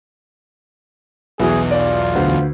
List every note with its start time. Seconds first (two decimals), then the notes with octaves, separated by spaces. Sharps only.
1.39 B1 E2 B3 E4 F#4 G#4
1.71 F4 D5
2.15 D2 B4 C5